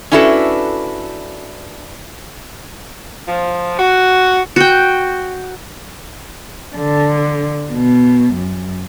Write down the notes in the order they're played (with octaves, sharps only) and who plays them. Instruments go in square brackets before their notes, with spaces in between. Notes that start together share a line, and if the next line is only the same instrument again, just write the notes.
[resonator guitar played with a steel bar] C#4 D4 E4 F#4 A4 B4
[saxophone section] F3
F#4
[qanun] F#4 G5
[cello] D3
B2
F#2